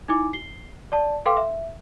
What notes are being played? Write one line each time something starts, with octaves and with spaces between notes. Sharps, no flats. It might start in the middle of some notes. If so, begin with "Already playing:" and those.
D#4 E4 G#5 D6
C7 G7
D5 A5
A4 B4 F5 G5 C6 D6
E5